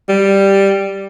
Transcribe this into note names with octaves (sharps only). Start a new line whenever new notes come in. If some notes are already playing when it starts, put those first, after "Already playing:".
G3